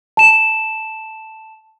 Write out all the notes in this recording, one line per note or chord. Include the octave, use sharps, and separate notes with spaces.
A5 E7